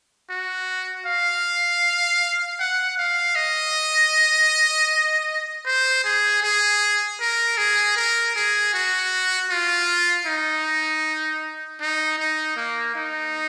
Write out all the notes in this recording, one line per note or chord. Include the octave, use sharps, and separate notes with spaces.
F#4
F5
F#5
F5
D#5
C5
G#4
G#4
A#4
G#4
A#4
G#4
F#4
F4
D#4
D#4
D#4
A#3
D#4